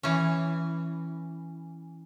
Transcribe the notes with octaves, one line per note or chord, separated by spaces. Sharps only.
E3 C#4